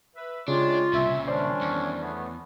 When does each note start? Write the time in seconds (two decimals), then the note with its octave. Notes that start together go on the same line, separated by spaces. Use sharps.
0.15 B4 E5
0.48 C#3 G#3 D4 F4 G4 C#5
0.93 C2 A#2 C#3 E5
1.27 D#3 G3 C#4 D4 C5 D5 C6
1.61 E2
2.01 A3 B3 C#5